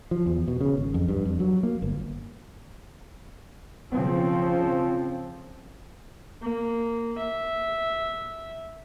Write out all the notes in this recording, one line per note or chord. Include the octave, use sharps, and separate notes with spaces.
F3
E2
B2
C#3
G#1
F2
G2
F2
F#3
A#3
G1
C#3 F3 C4
A#3
E5